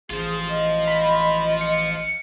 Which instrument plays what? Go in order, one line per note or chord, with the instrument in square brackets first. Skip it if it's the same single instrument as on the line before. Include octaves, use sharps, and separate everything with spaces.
[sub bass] A1 [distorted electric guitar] F4 C5 [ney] G#4
[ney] D#5
[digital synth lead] B5
C#7